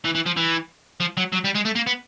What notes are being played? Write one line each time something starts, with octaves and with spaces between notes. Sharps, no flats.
E3
E3
F3
E3
F3
F#3
F#3
G3
G#3
A3
A#3
B3